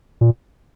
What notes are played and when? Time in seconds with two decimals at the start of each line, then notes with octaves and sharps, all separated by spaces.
0.21 A#2